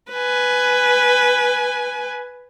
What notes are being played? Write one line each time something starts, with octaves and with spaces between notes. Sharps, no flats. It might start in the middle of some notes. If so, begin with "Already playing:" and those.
B4 G#5